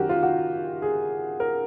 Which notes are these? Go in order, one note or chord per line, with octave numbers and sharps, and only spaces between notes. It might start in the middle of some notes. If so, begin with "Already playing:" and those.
Already playing: F#2 D#3 F#4 G4 A#4
F4
F#4
G#4
A#4